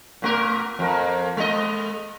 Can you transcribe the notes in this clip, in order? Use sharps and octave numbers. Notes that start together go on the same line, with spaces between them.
A#2 A3 A#4
F2 A#4
G#3 D#5